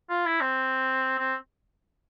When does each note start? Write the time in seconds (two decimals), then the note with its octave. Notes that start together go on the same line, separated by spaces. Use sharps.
0.10 F4
0.26 E4
0.41 C4
1.18 C4